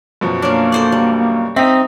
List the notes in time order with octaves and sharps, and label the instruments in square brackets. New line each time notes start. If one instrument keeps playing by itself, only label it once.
[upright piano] F#2 B2 F3
[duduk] A#3 [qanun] C#4 F5 [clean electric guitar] D4
[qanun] A4 C5 D5
G3
[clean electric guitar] C4 D#4 [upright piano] E5 [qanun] B5